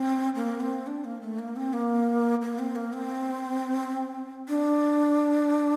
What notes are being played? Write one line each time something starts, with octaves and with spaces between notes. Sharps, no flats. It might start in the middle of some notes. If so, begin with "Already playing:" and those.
Already playing: C4
A#3
C4
D4
A#3
A3
A#3
C4
A#3
A#3
C4
A#3
C4
D4